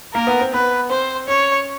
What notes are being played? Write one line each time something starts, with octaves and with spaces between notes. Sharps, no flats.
A#3 A#4
B3
C4
B3 B4
C4 C5
C#4 C#5